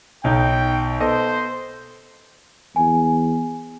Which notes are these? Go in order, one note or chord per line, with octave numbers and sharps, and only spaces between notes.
B1 D#4 G5 G6
B3 A4 C5 D#5
E2 G#5